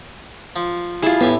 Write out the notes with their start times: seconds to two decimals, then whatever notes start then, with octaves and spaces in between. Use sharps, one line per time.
0.56 F3
1.02 G3 E4 F4 G#4 A5
1.21 A2 B3 G4 G#5